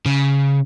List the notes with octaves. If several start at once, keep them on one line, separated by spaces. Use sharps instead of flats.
C#3